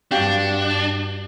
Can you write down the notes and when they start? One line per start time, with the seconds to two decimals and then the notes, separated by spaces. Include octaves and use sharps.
0.11 G2 D4 F#4 G4 F5